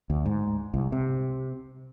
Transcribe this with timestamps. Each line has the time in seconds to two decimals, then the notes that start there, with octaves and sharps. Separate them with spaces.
0.10 D2
0.26 G#2
0.74 C2
0.92 C3